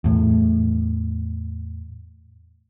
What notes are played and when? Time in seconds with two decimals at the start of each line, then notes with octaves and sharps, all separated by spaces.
0.04 E2 A2